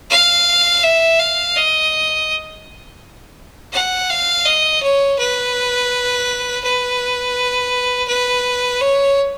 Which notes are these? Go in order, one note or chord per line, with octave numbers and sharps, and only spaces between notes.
F5
E5
F5
D#5
F#5
F5
D#5
C#5
B4
B4
B4
C#5